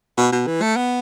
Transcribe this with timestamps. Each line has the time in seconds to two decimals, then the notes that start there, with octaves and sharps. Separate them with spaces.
0.17 B2
0.32 B2
0.47 E3
0.62 A3
0.77 B3